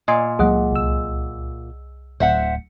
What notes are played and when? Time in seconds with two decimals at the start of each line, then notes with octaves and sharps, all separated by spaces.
0.08 A#2 D#5 G#5 C6
0.39 C#2 F#3 A#3 G#4 D#5 F#5
0.72 C2 E6
2.20 D1 C5 E5 F#5